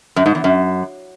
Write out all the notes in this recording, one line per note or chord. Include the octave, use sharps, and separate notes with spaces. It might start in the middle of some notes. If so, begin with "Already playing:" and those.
F#2
G#2
E2
F#2